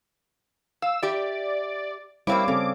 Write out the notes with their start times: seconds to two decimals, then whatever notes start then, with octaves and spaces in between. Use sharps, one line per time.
0.82 F5 E6
1.03 G4 D5 E5
2.27 G3 A#3 C4 E4 C#5 F5 D6
2.48 C#3 C4 A4